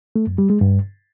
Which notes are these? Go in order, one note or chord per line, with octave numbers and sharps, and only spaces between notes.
A3
F#2
G3
G#3
G2